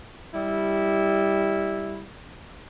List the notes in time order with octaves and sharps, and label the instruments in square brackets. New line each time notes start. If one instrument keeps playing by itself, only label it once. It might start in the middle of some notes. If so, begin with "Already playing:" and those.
[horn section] G3 E4